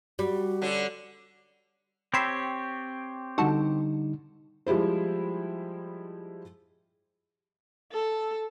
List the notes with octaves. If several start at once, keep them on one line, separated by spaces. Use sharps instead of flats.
G3 F#4
D3 C#4 D4
C4 G4 C#5 B5 C6 E6
D3 G3 D#4 F#4 A4
F3 G3 G#3 E4 C5
A4